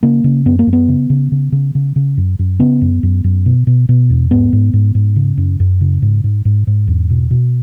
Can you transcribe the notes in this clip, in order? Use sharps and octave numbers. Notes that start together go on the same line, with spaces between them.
C#3 A#3
C#3
F#2 B3
A#3
F#2
B3
C#3
C#3
C#3
C#3
C#3
C#3
F#2
F#2
C#3 B3
F#2
F#2
F#2
B2
B2
B2
E2
G#2 B3
G#2
G#2
G#2
C#3
F#2
F#2
C#3
G#2
G#2
G#2
G#2
E2
B2
B2